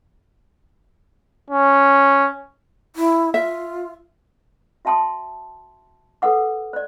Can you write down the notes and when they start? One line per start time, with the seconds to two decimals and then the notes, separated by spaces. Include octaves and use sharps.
1.50 C#4
2.96 E4
3.34 F4 E5
4.85 F#4 E5 G5 A5 C6 D#6
6.22 A4 B4 F#5 D6
6.73 C5 D5